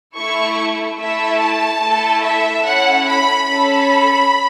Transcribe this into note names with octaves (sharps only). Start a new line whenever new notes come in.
A3 E4 A4 C#6
A3 E4 A4 E5
A5
A3 E4 A4
E5
C#4 E4 A4 F#5
B5
C#4 A4 B5